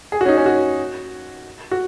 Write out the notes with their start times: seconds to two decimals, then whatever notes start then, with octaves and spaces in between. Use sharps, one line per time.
0.12 G#4
0.21 F#4
0.25 C#4
0.28 D#4
0.38 C#4
0.46 F#4
1.71 F#4